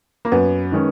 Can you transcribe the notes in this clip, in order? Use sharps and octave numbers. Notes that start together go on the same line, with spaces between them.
A#3
F#2 B3
D#3 G#3 C#4